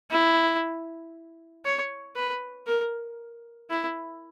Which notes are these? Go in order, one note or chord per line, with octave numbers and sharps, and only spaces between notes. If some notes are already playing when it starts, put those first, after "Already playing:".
E4
C#5
B4
A#4
E4